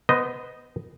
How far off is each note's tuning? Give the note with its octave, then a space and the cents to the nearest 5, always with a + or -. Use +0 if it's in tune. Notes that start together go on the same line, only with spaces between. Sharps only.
B3 +0 C5 -25 D#5 +0